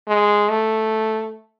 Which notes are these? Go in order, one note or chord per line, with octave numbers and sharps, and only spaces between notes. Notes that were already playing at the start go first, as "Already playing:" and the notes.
G#3
A3